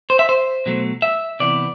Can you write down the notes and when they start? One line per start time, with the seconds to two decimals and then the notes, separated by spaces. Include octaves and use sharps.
0.10 C5
0.19 E5
0.29 C5
0.66 B2 F#3 A3
1.02 E5
1.40 C3 E3 B3 D5